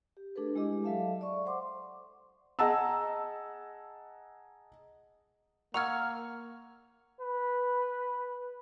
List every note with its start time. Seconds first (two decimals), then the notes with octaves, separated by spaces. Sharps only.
0.17 G4
0.36 A3 D4 G#4 A4 B4
0.55 G#3 E4 G4 G#4 D#5 D6
0.84 F#3 A4 E5 F5 A5
1.21 D5 E5 C#6
1.46 C5 F#5 C6 D6
2.59 G#4 D#5 F#5 A5 A#5 E6
5.74 A#3 F#5 A#5 C#6 E6 F6 G#6
7.20 B4